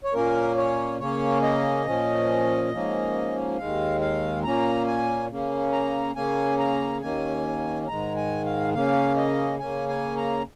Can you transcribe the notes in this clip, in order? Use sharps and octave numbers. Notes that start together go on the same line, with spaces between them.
C#5
A#2 A#3 C#4 A#4
C#5
C#3 A#3 C#4 C#5
D#5
A#2 F3 C#4
G#2 F3 A#3 C#4
D#2 D#3 G#3 F5
F5
A#2 A#3 C#4 A#5
G#5
C#3 A#3 C#4
A#5
C#3 A#3 C#4 G#5
A#5
D#2 D#3 A#3 C#4 G#5
G#2 D#3 G#3 A#5
G#5
F5
C#3 A#3 C#4 F5
D#5
C#3 A#3 C#4 G#5
G#5
A#5